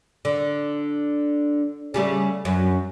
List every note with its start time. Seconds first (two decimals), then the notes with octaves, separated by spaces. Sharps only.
0.25 D3
1.94 C#3 G3 A3
2.45 F#2